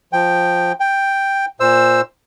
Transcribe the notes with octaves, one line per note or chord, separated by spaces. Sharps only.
F3 G5
G5
A#2 C5 E6